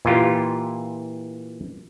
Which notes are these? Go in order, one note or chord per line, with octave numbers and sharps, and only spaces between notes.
A#2 E3 F4 G4